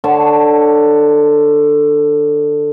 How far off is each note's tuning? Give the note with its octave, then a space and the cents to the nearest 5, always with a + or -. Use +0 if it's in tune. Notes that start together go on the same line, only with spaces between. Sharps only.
D3 +15 C#5 +0 A5 -10